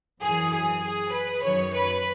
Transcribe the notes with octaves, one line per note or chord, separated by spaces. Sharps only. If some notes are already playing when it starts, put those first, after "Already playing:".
F#2 E3 G#4
G#4
G#4
B4
F#2 D#3 C#5
B4